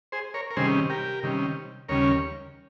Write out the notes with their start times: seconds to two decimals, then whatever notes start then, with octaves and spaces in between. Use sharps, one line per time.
0.12 G#4 C5
0.34 A#4 C#5
0.51 A#4
0.57 C3 D#3 G3 C#4 G#4 C5
0.90 G4 A#4
1.23 C3 D#3 G3 C#4
1.89 D#2 C#3 G3 C#4 A#4 C#5